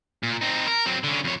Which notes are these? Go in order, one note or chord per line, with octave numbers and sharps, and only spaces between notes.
A#2
C4 D#4
A#4
F#3 C4
D3 C#4
F2 C#5